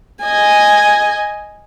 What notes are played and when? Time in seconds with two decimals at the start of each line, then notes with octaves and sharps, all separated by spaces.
0.23 D#5 G#5